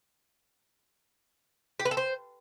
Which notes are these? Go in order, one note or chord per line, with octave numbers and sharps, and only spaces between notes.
G4
B4
A4
C5